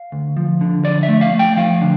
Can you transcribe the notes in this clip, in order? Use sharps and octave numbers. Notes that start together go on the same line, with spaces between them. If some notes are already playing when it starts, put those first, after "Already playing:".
Already playing: F5
D2
F3
D3
F3 D5
E5
A3
F5
A3
G5
F3 F5
D3